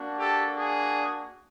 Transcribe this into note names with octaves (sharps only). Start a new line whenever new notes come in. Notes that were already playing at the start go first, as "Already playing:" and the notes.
Already playing: A#3 D4 F#4
G4 A4
G#4